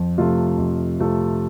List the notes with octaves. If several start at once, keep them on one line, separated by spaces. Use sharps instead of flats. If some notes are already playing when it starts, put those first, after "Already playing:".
Already playing: F2
C3 A3 F4
F2
C3 A3 F4